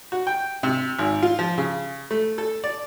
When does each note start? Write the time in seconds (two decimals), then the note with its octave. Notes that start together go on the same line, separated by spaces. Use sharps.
0.12 F#4
0.27 G5
0.63 C3
0.99 G#1
1.23 F4
1.39 F3
1.58 C#3
2.11 A3
2.38 A4
2.64 D5